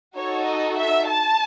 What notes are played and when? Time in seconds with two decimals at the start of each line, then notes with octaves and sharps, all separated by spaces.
0.16 D#4 F#4 A4 C#5
0.47 D#5
0.78 E5
1.09 A5